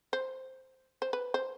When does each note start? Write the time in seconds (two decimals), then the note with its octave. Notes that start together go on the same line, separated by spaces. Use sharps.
0.13 C5
1.02 C5
1.13 B4
1.34 C5